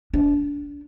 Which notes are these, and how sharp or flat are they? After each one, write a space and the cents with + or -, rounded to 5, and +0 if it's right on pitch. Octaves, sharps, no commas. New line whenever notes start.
D4 -30